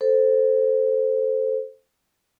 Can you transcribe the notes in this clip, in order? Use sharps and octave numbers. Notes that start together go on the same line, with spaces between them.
A4 C5